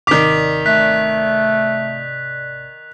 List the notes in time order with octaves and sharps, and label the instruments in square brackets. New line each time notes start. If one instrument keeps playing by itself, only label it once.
[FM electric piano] G#1 C3 D5 [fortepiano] D#3 D6 [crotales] B6 F7
[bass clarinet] A3 [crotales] F#6 B6